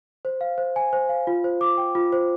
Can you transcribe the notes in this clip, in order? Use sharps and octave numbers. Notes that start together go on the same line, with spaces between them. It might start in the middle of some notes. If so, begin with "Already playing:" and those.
C5
F5
C5
G#5
C5
F5
F4
C5
D6
G5
F4
C5